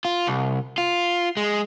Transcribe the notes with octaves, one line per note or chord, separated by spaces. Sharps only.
F4
C2
F4
G#3